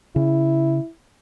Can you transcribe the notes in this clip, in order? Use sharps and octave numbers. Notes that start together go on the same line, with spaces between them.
C#3 E4